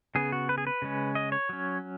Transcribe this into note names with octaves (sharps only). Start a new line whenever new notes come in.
C#3 B3 G#4
F#4
B4
G#4
B4
C#3 G#3 C#4
D#5
C#5
F#3 C#4